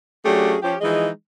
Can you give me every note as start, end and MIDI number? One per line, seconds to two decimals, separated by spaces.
0.25 0.55 54
0.25 0.55 57
0.25 0.55 61
0.25 0.55 62
0.25 0.55 67
0.25 0.55 68
0.63 0.74 53
0.63 0.74 61
0.63 0.74 67
0.81 1.08 52
0.81 1.08 53
0.81 1.08 56
0.81 1.08 63
0.81 1.08 68
0.81 1.08 75